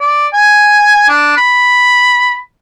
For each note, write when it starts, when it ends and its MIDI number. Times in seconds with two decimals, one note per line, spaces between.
0.01 0.27 74
0.33 1.07 80
1.09 1.33 62
1.37 2.39 83